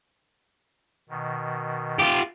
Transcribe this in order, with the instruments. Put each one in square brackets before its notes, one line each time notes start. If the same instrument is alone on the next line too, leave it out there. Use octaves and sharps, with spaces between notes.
[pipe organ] B2 D#3
[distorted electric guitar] F4 G4